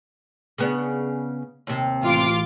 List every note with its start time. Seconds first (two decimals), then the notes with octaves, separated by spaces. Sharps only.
0.58 C#3 B3 D4
1.67 D#2 C3
2.03 A1 F4 D6